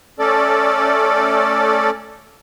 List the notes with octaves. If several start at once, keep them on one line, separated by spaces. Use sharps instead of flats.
A3 C#4 A4 D5